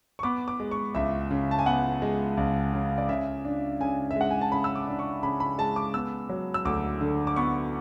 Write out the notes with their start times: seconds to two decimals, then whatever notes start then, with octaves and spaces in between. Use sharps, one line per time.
0.19 C#6
0.23 B3 D6
0.48 D6
0.60 G#3
0.71 C#6
0.95 C#2 E5
1.31 C#3
1.51 A5
1.59 G#5
1.66 B3 F#5
2.02 G#3
2.37 C#2
2.73 C#3
2.98 D5
3.09 C#3 E5
3.45 D4
3.80 C#3 G#5
4.11 E5
4.16 G#3 F#5
4.31 G#5
4.41 A5
4.51 C#3 B5
4.64 E6
4.75 D6
4.87 D4
4.99 C#6
5.23 C#3 B5
5.40 B5
5.58 G#3 A5
5.76 D6
5.94 B3 E6
6.30 F#3
6.54 E6
6.65 D2 D6
7.01 D3
7.27 D6
7.36 B3 C#6